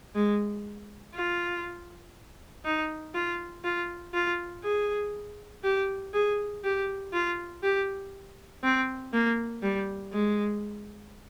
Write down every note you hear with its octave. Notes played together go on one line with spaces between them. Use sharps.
G#3
F4
D#4
F4
F4
F4
G#4
G4
G#4
G4
F4
G4
C4
A#3
G3
G#3